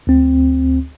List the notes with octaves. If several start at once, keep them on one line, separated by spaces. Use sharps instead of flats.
D2 C4